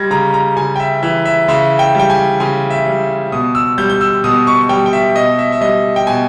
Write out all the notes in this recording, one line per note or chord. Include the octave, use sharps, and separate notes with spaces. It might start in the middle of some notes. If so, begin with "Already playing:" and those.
Already playing: G3 G#6 A#6
C#3 A#5
A#5
C#3 G#5
G5
E5
E3 E5
E5
C#3 E5
G5
G3 G5
G#5
C#3 G#5
E5
G3
B2 D#6
E6
G3 G6
G6
E6
B2 D#6
C#6
G3 G5
G5
E5
B2 D#5
E5
E5
G3 D#5
G5
B2 G#5